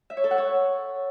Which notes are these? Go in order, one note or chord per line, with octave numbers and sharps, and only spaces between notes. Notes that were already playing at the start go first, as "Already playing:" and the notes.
E5
C#5
A4
F#5
C#5